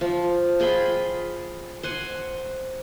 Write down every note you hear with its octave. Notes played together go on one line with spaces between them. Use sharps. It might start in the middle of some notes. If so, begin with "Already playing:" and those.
F3
F4 G#4 G5 B5
C5 F#5 G#5